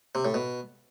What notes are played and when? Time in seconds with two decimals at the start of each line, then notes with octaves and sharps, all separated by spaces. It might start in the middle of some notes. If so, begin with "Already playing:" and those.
0.15 C3
0.25 A2
0.34 B2